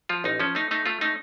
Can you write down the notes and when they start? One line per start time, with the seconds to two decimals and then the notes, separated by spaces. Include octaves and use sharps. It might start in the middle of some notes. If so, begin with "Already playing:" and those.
0.09 F3 F4
0.24 A1 D#4
0.40 F3 C#4
0.55 A3 D#4
0.71 A3 D#4
0.86 A3 F4
1.01 A3 D#4